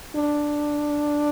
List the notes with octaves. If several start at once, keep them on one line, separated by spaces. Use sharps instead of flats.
D4